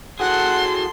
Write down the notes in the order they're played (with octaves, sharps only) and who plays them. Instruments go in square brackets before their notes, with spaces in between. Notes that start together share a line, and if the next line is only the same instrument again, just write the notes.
[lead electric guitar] F#4 G#4 [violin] A4 C6 [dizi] F#5